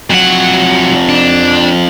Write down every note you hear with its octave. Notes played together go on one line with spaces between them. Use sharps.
F2 F#3 F#5
D4